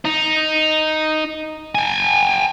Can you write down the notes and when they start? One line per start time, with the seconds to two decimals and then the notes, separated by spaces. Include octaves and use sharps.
0.05 D#4
1.75 G5 G#5